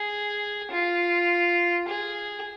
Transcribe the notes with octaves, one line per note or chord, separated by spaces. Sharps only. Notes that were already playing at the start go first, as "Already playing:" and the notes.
Already playing: G#4
F4
G#4